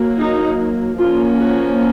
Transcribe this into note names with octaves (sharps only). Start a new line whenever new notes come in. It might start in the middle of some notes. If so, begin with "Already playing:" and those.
Already playing: F#3 A#3
D#4
F3 A#3 C#4 F4
F#4